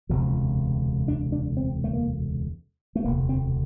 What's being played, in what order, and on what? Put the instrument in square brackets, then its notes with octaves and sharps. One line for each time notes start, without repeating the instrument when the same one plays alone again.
[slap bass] E1 D2 C3 F3
D4
D4
C4
A3
A#3
A3
E1 D2 C3 A#3
C4